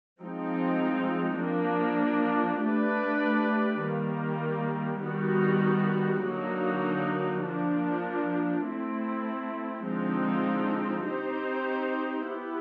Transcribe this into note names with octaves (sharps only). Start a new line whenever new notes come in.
F3 G#3 C4 D#4
F3 A#3 D4
A3 D4 G4 B4 D5
D#3 G3 A#3
D#3 G3 B3 D#4 F#4
D3 F#3 A#3 D#4 F#4
F3 A#3 D4
A3 C4 E4
D3 F3 G#3 C4 D#4
C4 D#4 G4 C5
B3 E4 G4